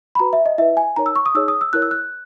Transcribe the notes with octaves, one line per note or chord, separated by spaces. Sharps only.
B5
F#4 B4 A#5
E5
D#5
E4 B4 E5
G#5
D#4 A#4 C#5 A#5
E6
C#6
D#6
D#4 G#4 C#5 E6
D#6
E6
E4 A#4 C#5 F#6
E6
F#6